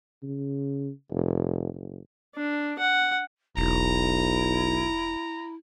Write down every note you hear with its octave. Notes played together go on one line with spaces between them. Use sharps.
C#3
F1
F#1
D4
F#5
E1 B1 E4 A#5